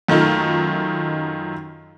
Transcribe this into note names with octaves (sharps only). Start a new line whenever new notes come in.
F#2 D#3 A3 D#4 F4